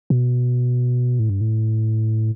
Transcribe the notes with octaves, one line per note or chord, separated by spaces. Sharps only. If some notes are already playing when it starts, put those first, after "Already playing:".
B2
A2
G2
A2